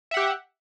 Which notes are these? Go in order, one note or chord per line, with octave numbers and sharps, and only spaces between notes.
G4 E5 F#5